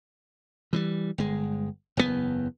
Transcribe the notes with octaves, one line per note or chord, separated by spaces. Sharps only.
E3 F3 G3
G1 G#3
F#1 E2 A#2 B3